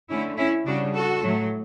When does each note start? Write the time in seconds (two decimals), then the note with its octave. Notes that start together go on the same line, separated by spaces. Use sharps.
0.10 D3 A3 C#4 E4
0.38 C#4 E4
0.66 C#3 G3 D4 F#4
0.95 F#4 A4
1.23 A2 F#3 A3